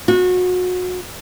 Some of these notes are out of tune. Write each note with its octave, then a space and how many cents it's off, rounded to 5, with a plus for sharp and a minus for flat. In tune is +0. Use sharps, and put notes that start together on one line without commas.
F#4 -30